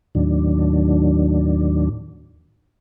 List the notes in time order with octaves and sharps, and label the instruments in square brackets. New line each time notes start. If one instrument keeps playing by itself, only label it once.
[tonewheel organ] D#2 A2 D#3 F#3 D4